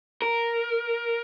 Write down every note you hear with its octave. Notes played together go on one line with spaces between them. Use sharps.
A#4